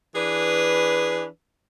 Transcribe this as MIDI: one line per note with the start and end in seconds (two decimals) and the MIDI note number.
0.15 1.26 52
0.15 1.26 62
0.15 1.26 68
0.15 1.26 71